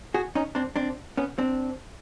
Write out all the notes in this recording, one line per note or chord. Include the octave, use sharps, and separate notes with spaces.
F#4 G#4
C#4 D#4
C4 D4
C4 D4
B3 C#4
C4 D4